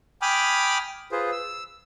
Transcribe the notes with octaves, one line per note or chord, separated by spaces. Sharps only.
G5 G#5 B5 D6 D#6 F6
F4 G#4 B4 C5
E6